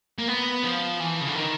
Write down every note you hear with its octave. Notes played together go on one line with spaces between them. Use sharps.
A#3
B3
F3
E3
C#3
D3
D#3